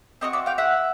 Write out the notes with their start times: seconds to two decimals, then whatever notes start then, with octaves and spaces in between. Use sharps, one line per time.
0.21 C4 D#4 F#4 C#5 D#5
0.33 D5 E5
0.46 F5 G5
0.58 E5 F#5